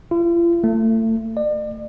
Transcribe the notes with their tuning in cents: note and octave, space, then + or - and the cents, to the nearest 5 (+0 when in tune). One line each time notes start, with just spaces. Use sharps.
F4 -45
A3 +30
D5 +40